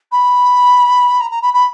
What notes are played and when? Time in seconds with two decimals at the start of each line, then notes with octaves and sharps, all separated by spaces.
0.11 B5
1.20 A#5
1.31 A#5
1.42 B5
1.53 B5